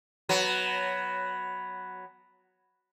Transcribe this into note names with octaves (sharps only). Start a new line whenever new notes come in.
F#3 B3